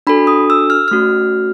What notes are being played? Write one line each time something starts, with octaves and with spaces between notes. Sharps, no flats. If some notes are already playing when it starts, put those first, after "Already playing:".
D4 F#4 A4 B5
D#6
E6
F6
A3 C#4 F#4 F6